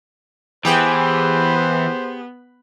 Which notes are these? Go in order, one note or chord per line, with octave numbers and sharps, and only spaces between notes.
E3 B3 G4 G#4 C5 G5